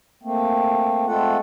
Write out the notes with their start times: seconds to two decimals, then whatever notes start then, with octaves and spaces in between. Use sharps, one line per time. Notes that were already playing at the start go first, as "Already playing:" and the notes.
0.23 A3 A#3 C4
1.07 G#3 A3 C4 F4 A4 F#5